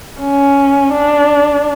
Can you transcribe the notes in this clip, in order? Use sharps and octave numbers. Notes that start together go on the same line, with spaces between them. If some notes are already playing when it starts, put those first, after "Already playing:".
C#4
D4